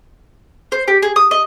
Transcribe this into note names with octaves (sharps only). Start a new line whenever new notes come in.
C5
G4
G#4
D#6
D#5